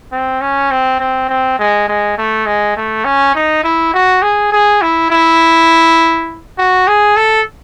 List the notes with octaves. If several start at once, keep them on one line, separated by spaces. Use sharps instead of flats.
C4
C#4
C4
C4
C4
G#3
G#3
A3
G#3
A3
C#4
D#4
E4
F#4
G#4
G#4
E4
E4
F#4
G#4
A4